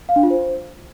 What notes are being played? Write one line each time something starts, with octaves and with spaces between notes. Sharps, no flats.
F5
D4
F4
C5